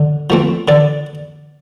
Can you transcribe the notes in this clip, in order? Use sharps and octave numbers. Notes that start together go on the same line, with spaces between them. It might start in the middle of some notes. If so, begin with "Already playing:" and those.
Already playing: D3
F3 A3 C4
D3 D5